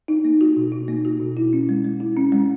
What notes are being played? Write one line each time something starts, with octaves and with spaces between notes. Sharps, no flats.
D#4
A#3
F#4
B2
D#4
A#3
F#4
B2
E4
C#4
G#3
G#3
E4
C#4
G#3